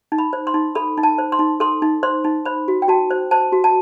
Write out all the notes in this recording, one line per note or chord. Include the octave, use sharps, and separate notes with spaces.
D#4
B5
C5
C6
D#4
A4 B5
D#4
A5
C5
C6
D#4
A4 C6
D#4
C5 C6
D#4
C5 B5
F#4
G5
F#4 A5
C5
C5 A5
F#4
A5